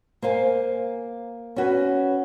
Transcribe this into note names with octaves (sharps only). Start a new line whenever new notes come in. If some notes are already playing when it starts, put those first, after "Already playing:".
A#3 C5 F5 G#5
C#4 F#4 B4